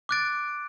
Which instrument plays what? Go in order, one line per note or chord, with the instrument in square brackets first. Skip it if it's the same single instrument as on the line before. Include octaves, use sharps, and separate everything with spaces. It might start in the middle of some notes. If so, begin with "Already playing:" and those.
[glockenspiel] D6 F#6 A6 D7